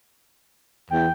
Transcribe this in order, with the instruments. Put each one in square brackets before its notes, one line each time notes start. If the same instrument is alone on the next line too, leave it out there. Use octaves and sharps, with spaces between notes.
[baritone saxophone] E2 [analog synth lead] G5